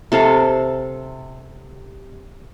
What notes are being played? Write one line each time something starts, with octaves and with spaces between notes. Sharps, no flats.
C3 A4 F5 A#5